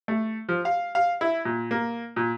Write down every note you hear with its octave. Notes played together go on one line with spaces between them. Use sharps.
A3
F3
F5
F5
E4
A#2
A#3
A#2